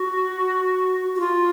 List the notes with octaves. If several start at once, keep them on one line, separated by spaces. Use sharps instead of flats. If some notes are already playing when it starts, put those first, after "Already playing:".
Already playing: F#4
F#4
F4